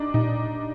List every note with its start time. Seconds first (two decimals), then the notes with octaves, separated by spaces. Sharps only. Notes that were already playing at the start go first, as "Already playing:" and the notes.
Already playing: D4 D#4
0.14 A#2 D#4